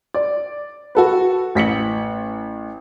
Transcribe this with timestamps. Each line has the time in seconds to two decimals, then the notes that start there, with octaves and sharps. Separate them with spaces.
0.14 D5
0.95 F#4 A4 B4
1.55 A1 B6 C#7 F#7